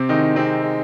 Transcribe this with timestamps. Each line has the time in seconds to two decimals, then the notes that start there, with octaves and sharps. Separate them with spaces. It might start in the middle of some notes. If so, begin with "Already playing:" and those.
Already playing: C3 C4
0.09 D#3 G#3 D#4
0.36 C3 G#3 C4
0.64 G#3